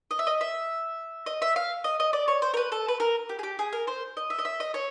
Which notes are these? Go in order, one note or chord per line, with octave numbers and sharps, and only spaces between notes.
D#5
E5
D#5
E5
D#5
E5
F5
D#5
D#5
D5
C#5
C5
A#4
B4
A4
B4
A#4
G4
G#4
G4
G#4
A#4
C5
D#5
E5
D#5
E5
D#5
C#5